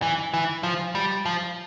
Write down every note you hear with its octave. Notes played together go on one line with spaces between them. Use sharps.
E3
E3
F3
G3
F3